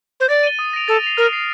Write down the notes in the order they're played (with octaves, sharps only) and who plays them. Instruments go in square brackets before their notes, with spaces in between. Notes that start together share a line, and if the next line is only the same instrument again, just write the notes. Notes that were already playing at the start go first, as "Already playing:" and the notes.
[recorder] C5
[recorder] D5 [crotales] A6
[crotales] D#7 G7
D#6
A#6 D7 F7
[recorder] A4 [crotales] A6
[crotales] C7 F7
[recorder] A#4 [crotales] F6
[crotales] C7 F7